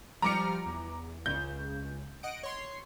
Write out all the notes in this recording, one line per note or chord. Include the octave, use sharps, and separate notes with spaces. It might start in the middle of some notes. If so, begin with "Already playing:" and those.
F3 G3 A#5 D6 F6 C#7
E2
C#2 C#3 G6
D#5 F#5 D7
C#5 C6 C7